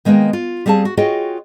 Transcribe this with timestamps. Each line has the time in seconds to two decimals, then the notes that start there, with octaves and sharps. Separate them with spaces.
0.05 D#3 G#3 A#3 B3 G5
0.33 F4
0.66 G3 C4 G#4 F5 A5
0.85 F#4
0.97 F4 F#4 G#4 C#5 D#5 G5